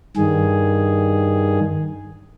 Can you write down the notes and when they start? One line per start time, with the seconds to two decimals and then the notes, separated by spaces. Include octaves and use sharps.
0.17 G2 D#3 G#4